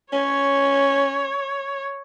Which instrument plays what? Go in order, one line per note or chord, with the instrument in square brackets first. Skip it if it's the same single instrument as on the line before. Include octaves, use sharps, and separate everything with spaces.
[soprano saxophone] C#4 [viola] C#5